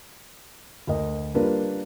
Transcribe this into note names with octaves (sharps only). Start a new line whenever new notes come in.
D2 A#4 D#5
G3 A#3 D4 F4 A#4 B4